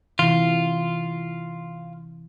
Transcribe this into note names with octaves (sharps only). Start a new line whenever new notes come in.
C3 E3 F4